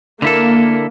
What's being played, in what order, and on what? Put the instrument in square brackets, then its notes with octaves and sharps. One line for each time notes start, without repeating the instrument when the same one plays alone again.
[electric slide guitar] D3 E4 A4 [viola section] A#3